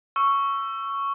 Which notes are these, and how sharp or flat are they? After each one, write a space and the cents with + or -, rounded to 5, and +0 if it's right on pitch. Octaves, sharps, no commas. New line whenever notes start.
C#6 +0 E6 +25